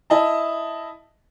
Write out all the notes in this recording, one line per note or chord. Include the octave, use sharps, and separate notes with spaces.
E4 D#5 A5